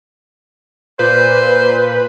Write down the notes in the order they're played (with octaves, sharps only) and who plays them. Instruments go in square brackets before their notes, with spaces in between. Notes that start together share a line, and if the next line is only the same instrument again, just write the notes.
[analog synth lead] A#2 [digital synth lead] B4 [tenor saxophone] C5